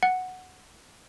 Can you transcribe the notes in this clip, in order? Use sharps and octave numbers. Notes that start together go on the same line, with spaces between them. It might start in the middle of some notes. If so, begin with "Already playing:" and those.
F#5